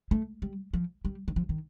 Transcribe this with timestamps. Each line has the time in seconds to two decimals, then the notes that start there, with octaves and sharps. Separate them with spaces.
0.11 A3
0.42 G3
0.74 F3
1.05 G3
1.28 D#3
1.36 F3
1.49 D#3